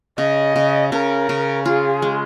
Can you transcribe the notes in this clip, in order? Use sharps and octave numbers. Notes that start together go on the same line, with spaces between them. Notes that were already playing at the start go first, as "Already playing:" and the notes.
C#3 D#5
C#3
C#3 A#4
C#3
F4 G#4
G#3